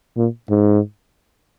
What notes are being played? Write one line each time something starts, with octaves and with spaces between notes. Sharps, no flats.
A#2
G#2